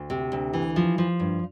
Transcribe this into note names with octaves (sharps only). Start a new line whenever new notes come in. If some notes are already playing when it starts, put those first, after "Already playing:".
Already playing: D2
C3
D2
E3
F3
F3
G2